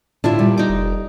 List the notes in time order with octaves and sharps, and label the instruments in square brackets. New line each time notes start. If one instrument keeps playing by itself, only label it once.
[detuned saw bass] A2 [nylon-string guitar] D4 [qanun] E4 F4 E5
[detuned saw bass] A#2 [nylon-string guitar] G3
[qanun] D#4 D6
[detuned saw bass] F1